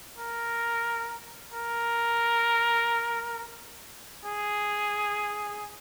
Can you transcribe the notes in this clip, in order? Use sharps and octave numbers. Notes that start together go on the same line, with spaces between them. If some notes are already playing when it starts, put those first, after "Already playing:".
A#4
A#4
G#4